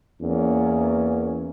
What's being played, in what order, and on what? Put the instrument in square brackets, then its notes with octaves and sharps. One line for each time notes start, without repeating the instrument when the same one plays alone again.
[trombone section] E2 A#3 C#4